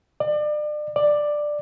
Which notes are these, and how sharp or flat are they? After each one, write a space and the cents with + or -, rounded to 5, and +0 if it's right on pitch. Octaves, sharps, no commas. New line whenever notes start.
D5 +35
D5 +10